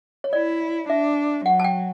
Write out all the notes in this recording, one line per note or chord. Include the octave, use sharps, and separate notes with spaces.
C#5
E4 D5
D4 E5
F#3 F#5
A5
G5